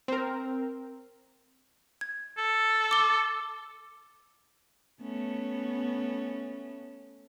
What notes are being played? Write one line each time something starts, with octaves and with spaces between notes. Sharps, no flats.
C4 A#4
G#6
A4
D6 G7
A3 B3 C#4